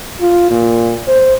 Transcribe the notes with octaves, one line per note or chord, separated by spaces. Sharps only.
F4
A#2
C5